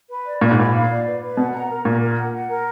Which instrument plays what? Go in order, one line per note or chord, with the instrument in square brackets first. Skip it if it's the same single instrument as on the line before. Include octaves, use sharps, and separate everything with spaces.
[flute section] B4
D5
[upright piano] A#2 [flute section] B5
[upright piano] G#2
[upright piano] A#2 [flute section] B5
[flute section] F5
D5
B4
B4
[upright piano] B2 [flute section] F#5
[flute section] A#5
A#4
[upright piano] A#2 [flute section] A#4
[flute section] A#4
F#5
F#5
A#4